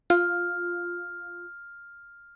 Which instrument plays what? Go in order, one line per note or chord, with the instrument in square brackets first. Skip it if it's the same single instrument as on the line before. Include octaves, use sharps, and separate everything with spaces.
[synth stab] F4 [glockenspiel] F6